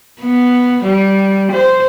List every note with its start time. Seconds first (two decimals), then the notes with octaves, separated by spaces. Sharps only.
0.21 B3
0.84 G3
1.52 C5